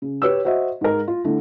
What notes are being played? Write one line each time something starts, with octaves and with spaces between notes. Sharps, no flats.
C#3
G4 B4 C#5 E6
F#4 C5 D#5 E5
G#2 A#4
F4
D3 A3 E4